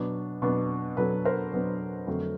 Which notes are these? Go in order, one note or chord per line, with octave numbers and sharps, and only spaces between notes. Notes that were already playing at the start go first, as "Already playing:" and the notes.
Already playing: B2 F#3 B3 D4
B2 F#3 B3 D4
B2 F#3 B3 D4 A4 B4
A#4 C5
B2 F#3 B3 D4
F2 D3 F#3 A3